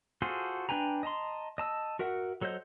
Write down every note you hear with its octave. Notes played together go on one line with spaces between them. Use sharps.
F4 F#4 G#4 A4 C5
D4 B4 G5 G#5 A#5
D#5 A5 A#5 C6
D#5 A5 E6
F#4 A#4 E5 F#5
F#3 A4 C5 D#5 G6